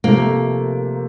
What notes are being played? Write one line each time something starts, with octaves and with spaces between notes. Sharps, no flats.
C3 F3 A3 A#3